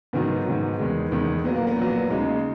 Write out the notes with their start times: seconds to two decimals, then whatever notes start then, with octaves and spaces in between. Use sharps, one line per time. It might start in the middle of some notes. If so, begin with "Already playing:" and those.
0.13 G#2 D#3 F#3 B3
0.46 G#2 D#3 F#3
0.79 E2 D#3 G#3
1.12 E2 D#3 G#3
1.44 A#2 B3
1.48 F#3
1.56 A#3
1.67 B3
1.77 A#2 F#3
2.10 D#2 C#3 G#3 D#4